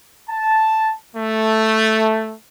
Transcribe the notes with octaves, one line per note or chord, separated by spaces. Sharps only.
A5
A3